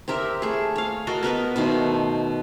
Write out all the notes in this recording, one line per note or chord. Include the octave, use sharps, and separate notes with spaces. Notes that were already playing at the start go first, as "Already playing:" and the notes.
C4 G4 A#4 E5
A3 G#4
C#5 F5
F#4 A4 A#4 D#5
B3 A#4 B4 D#5
B2 D#3 A3 C5